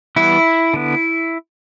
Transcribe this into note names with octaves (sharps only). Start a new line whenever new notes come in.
E3 G3 B3 E4
D3 B3